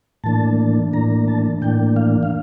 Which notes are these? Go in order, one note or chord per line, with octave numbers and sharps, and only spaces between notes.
A2 E3 A#3 D4 A5
A2 E3 A#3 D4 A#5
A5
A2 E3 A#3 D4 G5
F5
F5